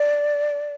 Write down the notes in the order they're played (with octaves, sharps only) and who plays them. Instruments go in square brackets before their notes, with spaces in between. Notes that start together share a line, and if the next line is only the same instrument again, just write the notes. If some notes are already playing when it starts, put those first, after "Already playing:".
Already playing: [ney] D5